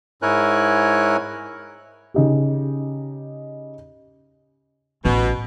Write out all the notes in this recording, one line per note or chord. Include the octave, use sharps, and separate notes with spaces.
G#2 E4 A#4 C#5 G#5 F#6
C#3 D#4 G4
A1 B2